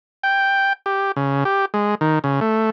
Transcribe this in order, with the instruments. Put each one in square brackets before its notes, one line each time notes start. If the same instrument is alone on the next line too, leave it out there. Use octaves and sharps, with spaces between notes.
[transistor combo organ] G5
G4
C#3
G4
G#3
D#3
C#3
A3